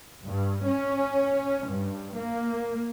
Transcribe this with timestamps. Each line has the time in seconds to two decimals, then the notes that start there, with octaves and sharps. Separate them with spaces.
0.25 G2
0.66 C#4
1.67 G2
2.18 A#3